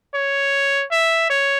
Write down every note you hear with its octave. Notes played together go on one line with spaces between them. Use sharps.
C#5
E5
C#5